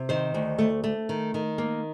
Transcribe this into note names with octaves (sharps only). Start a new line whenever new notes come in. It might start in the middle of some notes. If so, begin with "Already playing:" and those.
Already playing: C3
D#3 C5
D2
A3
A3
D#3
D#3
A#3